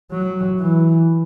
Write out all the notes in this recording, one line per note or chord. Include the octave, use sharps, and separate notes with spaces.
F#3
E3